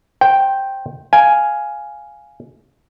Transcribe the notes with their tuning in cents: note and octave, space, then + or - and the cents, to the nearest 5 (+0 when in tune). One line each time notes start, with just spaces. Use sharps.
C5 +25 G5 +0
F5 +0 G#5 +5